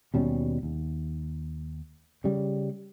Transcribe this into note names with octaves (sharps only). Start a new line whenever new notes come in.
D#2 B2 G3 C#4
D#2
C#3 G3